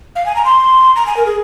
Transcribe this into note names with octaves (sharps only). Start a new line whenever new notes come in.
F5
G#5
A#5
C6
A#5
G#5
A#4
G#4